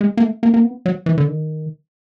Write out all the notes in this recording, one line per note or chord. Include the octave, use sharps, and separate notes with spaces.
G#3
A#3
A3
A#3
A#3
B3
F#3
E3
D3
D#3